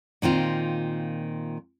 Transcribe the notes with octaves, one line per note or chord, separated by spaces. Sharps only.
A#2 D#3 C4 F4